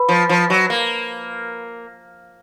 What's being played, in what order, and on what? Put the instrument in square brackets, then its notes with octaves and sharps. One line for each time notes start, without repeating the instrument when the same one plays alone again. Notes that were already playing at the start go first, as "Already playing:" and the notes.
Already playing: [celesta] B4 B5
[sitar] F3
F3
F#3
A#3